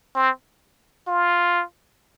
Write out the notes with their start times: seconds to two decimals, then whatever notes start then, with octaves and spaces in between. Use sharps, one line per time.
0.16 C4
1.08 F4